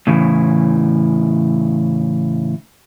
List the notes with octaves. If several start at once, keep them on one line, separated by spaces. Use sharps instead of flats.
A2 C#3 E3